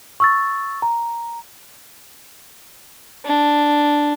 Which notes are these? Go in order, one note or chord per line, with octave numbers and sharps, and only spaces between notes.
C#6 E6 A6
A#5
D4